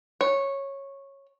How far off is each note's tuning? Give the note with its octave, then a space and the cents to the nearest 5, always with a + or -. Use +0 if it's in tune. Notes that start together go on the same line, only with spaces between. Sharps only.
C#5 -10